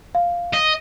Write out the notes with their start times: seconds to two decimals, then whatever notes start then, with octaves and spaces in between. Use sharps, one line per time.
0.15 F5
0.53 D#5